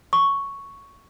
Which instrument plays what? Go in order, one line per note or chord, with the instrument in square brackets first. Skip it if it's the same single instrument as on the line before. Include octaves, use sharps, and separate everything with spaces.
[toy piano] C#6